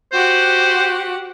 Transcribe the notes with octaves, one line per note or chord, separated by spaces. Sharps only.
F#4 G4 C5 F#5